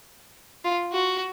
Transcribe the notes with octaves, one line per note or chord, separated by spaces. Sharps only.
F4
F#4